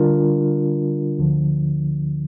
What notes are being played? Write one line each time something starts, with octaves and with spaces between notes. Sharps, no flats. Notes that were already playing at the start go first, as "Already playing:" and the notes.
Already playing: D3 G3 D4 F4 A#4
D2 D3 F3